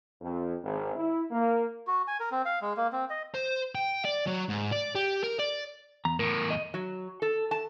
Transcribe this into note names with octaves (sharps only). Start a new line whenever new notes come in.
F2
G#1
E4
A#3
F#4
G#5
A#4
C4
F5
G#3
A#3
C4
D#5
C5
G5
D5
F#3
G#2
D5
G4
A#4
D5
E2 A#5
E2 A2 A#4
D#5
F#3
A4
A5